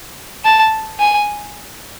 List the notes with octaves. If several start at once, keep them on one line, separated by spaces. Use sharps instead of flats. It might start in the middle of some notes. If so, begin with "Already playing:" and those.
A5
G#5